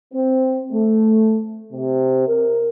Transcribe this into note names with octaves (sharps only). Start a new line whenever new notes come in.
C4
A3
C3
A#4